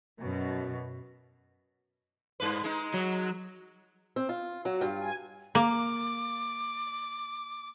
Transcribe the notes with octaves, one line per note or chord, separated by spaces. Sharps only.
F#2 B2
G2 B4
G#3 D#4
F#3
C4
F4
F#3 F#4
G2 F4
G#5
A#3 D6